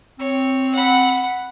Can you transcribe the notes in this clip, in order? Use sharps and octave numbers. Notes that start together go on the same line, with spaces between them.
C4 C#5
F#5 B5